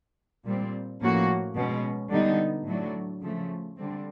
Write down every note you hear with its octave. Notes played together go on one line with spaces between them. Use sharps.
A#2 G3 C4
A2 F3 A#3 C#4 F#4
B2 G#3 C#4
D3 G3 B3 D#4
A2 F#3 A3 D4
C#3 F3 A3
D3 G3 C4